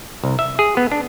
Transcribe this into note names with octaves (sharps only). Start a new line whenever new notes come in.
C2
E5
G#4
B3
D4